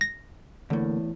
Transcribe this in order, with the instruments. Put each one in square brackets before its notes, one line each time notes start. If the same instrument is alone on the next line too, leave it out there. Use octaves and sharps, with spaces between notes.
[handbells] A#6
[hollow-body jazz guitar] E2 A2 [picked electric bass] D3 A3 A#3